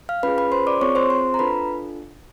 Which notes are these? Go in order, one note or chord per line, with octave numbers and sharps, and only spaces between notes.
F5 F6
C#4 F4 G#4 B4 B5
B4 B5
C5 C6
D5 D6
C4 F4 G#4 C#5 C#6
C5 C6
C5 C6
A#5
D4 F4 A4 B4 B5